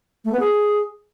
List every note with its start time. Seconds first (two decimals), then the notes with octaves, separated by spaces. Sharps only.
0.24 A3
0.32 B3
0.40 G#4